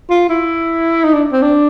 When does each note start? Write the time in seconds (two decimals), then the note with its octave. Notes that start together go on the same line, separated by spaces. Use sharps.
0.10 F4
0.29 E4
1.04 D#4
1.14 D4
1.32 C4
1.42 D4